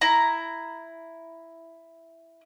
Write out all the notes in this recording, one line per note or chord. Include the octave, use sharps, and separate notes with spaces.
E4 A#5